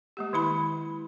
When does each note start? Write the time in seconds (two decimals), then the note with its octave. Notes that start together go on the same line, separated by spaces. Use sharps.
0.17 G#3 A#3 G4
0.33 D#3 G#3 E4 B5